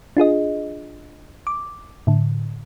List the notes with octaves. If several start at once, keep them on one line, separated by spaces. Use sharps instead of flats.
D4 F4 G#4 D#5
D6
A2 D3